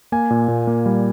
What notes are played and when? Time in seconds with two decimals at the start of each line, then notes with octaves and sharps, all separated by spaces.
0.12 A#3 G#5
0.30 A#2
0.48 A#2
0.67 A#3
0.86 G3